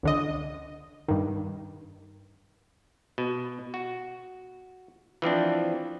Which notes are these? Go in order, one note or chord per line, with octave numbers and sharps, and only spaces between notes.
C#2 D3 D#5
G2 D#3
B2
F#4
E3 F3 C4 D4